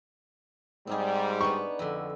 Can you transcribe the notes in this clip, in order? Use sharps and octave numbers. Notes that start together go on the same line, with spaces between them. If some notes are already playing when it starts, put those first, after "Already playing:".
G#2 G3 C4 D#4 G#4
B3 D4 D#4 C#6
F2 D3